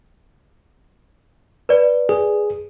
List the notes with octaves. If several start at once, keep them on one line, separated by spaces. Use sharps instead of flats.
B4 D5
G#4